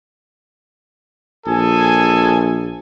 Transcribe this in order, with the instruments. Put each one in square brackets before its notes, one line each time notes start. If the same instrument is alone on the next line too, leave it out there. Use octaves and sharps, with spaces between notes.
[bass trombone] A#1 [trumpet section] G#4 A4 G#5